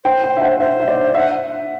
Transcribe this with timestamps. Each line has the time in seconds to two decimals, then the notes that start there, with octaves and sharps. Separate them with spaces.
0.05 C5 G5
0.23 G5
0.37 E5
0.42 F#5
0.60 C5 E5
0.80 E5
0.88 D5
1.15 E5 F#5